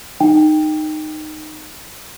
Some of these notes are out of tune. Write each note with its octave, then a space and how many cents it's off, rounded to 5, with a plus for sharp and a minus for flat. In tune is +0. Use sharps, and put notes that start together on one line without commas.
D#4 -15 G5 +5